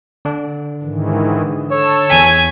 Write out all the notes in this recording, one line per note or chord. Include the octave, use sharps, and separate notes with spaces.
D3 D4
G#2 D#3 E3
A4 C#5 E6
E2 G#5 B6